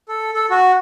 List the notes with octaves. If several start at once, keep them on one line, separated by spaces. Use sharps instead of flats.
A4
A4
F#4